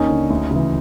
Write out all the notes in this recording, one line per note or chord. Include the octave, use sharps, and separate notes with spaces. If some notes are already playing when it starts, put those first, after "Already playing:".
Already playing: D#2 C#4 D#4
D3
D2
C#3 E3